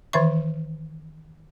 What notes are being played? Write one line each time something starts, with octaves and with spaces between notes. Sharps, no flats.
D#3 E3 E5 C#6